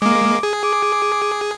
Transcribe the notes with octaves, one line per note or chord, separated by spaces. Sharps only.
G#3 A#3 D6
G#4
D6